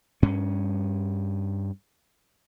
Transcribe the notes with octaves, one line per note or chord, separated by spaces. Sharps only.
G2 C#4